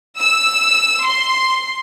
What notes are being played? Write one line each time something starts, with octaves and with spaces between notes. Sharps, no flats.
E6
C6